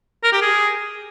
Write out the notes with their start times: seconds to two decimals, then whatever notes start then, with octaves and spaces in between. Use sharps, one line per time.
0.24 A#4
0.33 G4
0.42 G#4